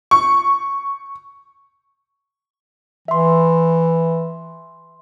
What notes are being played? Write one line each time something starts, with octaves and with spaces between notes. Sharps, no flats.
C#6
E3 E5 C6